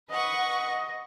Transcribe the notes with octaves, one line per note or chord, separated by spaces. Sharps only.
B4 D#5 F#5 C#6